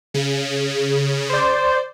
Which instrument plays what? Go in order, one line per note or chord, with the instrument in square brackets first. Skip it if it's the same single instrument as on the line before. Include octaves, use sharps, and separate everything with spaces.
[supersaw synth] C#3
[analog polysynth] C5 D5